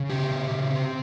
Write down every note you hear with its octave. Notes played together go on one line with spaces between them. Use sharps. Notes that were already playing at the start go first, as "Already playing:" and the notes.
Already playing: C#3
C#4 G4
C#3
C#3
C4